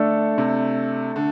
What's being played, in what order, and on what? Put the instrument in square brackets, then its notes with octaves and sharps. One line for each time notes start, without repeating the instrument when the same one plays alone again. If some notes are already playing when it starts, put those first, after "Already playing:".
Already playing: [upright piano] D3 [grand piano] A3 D4 A4
[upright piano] C3
D3